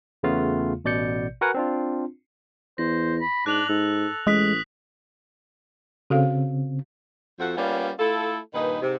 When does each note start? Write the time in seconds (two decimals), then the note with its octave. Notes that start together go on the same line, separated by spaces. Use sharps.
0.23 E2 C#3 A3 B3 F4 F5
0.84 A1 B2 D5 G6 C#7
1.41 F#4 A#4 B4 F#5 G#5
1.54 C4 D4 F4
2.78 E2 C5 A#6
3.21 B5
3.46 G#2 D4 F#6 F7 F#7
3.69 G#2 A4
4.27 A1 G#3 D#6 F#6 B6
6.10 C#3 C4 F#4 A4 F5
7.40 F2 F3 C4 F#4 A4 F#5
7.56 G3 A#3 B3 C#4 F4 D5
7.99 A3 E4 F4 A4
8.54 G2 A#2 D#3 D#4 B4
8.82 G#2 C3